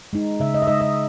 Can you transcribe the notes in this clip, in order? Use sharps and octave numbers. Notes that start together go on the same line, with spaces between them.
G#3 D#4
C#3 E5
D#5
E5
G#3 D#4 D#5
D#5